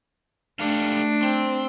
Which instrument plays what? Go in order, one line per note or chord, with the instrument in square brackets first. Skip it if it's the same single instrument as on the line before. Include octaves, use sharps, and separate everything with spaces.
[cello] A3 D4 [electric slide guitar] G4 A4 F5
[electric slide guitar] C4